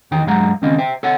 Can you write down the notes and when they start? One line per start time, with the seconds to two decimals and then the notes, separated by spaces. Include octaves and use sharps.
0.11 E2 D#3 D#4 G5
0.26 G2 F#3 G#3 F5 F#5 A#5
0.62 C#2 D#3 C4 C#4 D#5 F5
0.79 C5 E5 G5
1.03 A4 C#5 F#5